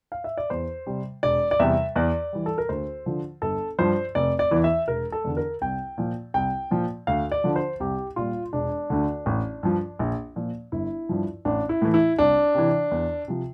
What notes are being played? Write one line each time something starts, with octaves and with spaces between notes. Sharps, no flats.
F5
E5
D5
E2 C5
C3 G3
E1 D5
D5
E2 C3 G3 E5
E2 D5
E3 G3
A4
A#4
D2 C5
D3 F3
G1 A4
G2 F3 C5
F1 D5
D5
E2 E3
E5
E1 A#4
A4
E2 D3
A#4
C2 G5
A#2 F3
C2 G5
A#2 F3
D2 F5
D5
D3 F3
C5
C2 G4
A#2 G3 F4
E1 D4
D2 D3
A1
G2 F3
A#1
A#2 F3
G1 E4
G2 F3
A1 D4
E4
A2 E3
E4
C2 D4
C3 E3
E2
C3 F3